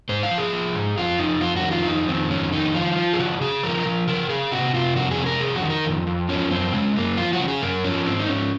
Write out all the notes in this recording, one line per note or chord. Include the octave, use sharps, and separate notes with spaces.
G#2 C5
F5
F3
G#4
F3
G#2
F2 F4
F2 D#4
F2 F4
F#4
D#3
F4
F2 D#4
D#3 C4
F2 C#4
D#3 D#4
F3 F4
F3
G#4
C#3 F#4
C#3 G#4
F3 A#4
F3
C#3 A#4
C#3 G#4
C3 F#4
C3 F4
F2 F#4
G#4
C3
A#4
F2 G#4
F#4
D#3
A#4
F2
F2
F3 C#4
F#2 C4
C#3 G#3
F#2 A#3
F3 F4
F#4
C#3
G#4
F#2 A#4
F3 C#4
G#2 C4
D#4
G#2 C#4